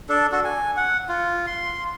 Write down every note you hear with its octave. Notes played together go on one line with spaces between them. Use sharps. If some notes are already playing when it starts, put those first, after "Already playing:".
D4 A4
F#4 A4
G#5
F#5
F4
C6